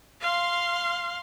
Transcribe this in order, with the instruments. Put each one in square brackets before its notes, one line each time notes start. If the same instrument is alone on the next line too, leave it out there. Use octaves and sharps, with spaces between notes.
[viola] F5 C6